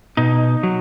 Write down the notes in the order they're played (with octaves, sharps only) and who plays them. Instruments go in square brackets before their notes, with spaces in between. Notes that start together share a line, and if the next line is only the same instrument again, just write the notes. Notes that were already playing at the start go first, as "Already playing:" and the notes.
[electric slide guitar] B2 D#4
F#3